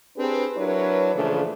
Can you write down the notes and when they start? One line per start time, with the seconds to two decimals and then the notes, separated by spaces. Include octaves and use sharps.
0.17 C4 D4 G4 G#4 B4
0.57 F#3 D4 E4 A#4 B4 C#5
1.14 A#2 C#3 E3 F3 A3 D4